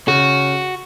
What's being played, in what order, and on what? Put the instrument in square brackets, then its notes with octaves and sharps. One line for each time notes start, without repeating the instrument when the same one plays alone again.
[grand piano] C#3 [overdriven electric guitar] F#4